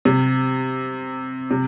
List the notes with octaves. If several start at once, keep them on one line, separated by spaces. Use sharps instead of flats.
C3
C3